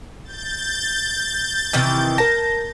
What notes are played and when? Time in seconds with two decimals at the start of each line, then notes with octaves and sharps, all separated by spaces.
0.24 G6 A6
1.73 C3 D#3 E3
2.18 A#4 A5 A#6